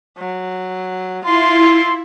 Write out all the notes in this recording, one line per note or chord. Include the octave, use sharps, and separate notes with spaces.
F#3
E4 F4 C6